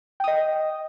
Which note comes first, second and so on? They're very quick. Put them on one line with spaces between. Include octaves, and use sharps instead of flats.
G5 D#6 D#5